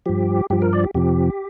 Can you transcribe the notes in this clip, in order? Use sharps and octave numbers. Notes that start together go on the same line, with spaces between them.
G2 F3 G4
G2 F3 G4
A#4
D5
G4
F2 C3 F3 G4